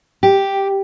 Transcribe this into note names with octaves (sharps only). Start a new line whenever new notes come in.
G4